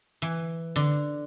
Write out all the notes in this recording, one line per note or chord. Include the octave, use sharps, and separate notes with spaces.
E3
D3